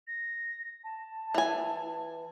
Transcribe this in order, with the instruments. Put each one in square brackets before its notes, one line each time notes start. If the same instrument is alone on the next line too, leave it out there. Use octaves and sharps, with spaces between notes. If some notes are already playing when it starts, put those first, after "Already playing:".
[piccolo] A#6
A5
[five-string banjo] E3 G#5